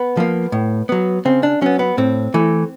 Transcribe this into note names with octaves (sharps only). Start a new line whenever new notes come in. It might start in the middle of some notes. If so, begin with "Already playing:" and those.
Already playing: B3
F3 A#3
A2
F#3 B3
C#3 C4
D4
F#3 B3 C#4
B3
A2 C4
E3 A3